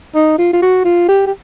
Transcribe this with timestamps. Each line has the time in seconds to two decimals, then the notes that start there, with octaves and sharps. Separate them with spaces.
0.15 D#4
0.38 F4
0.53 F4
0.62 F#4
0.85 F4
1.08 G4
1.27 G4